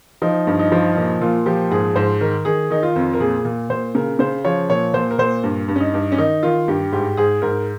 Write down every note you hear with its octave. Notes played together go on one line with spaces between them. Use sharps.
F3 D#4
G2
D#4
F3
A#2 D#4
A#2 F4
F3 G4
G#2 G#4
G#2 C5
D#3 A#4
D#3 G#4
D#3 D#4
F4
F2
A#4
A#2 G#4
A#2
A#2 C5
C#3 A#4
C#3 C5
F3 C#5
A#2 C#5
A#2 C5
A#4
A#2 C5
G2
G2
C#4
D#4
G2
C#4
D#3 D#4
D#3 F4
G2 G4
G#2 G4
G#2 G#4
G#2 A#4